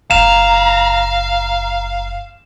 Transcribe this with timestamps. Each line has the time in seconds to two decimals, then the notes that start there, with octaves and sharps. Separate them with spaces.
0.11 F#1 F#2 F5 A#5 E7